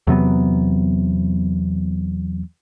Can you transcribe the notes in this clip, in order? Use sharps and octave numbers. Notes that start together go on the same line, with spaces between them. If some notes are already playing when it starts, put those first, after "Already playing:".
E2 C3 F#3 B3